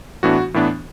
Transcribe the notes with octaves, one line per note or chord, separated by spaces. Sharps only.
A2 E3 B3 D4 F#4
A2 E3 B3 D4